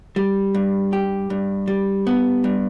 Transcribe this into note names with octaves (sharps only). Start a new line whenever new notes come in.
G3
G2
G4
G2
G3
B3
G2